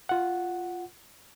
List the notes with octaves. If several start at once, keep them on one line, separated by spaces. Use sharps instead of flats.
F4 F#5